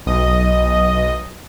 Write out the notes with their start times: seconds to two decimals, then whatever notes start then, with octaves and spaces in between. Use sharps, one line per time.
0.06 B1 D#5